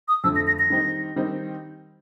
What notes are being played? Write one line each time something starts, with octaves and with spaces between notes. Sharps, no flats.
D#6
F2 D3 F3 A3 E6
A#6
A#6
A#6
D#3 G3 C4 D#4
D#3 G3 C4 D#4